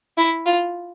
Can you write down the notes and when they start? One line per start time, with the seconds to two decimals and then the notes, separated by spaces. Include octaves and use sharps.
0.17 E4
0.46 F4